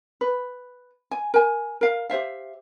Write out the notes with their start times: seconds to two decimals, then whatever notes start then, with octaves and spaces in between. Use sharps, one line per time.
0.21 B4
1.11 G#5
1.34 A#4 G#5
1.81 A#4 F5
2.10 G4 C5 E5 F5